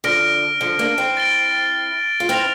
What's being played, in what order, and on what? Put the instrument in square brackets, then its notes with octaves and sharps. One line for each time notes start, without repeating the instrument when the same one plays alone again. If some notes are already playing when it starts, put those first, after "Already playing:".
[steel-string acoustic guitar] D3 F3 [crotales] F6 A#6 D7
[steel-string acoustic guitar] D3 F3
A#3 D4
C4 E4
[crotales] A6 D7 G7
[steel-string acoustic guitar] F4
[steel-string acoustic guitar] C4 E4 [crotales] F6 A#6 F7